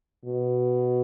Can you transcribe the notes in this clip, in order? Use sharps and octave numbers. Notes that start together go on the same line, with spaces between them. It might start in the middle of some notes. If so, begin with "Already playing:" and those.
B2